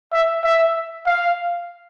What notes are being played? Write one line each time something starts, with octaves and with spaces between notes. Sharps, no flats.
E5
E5
F5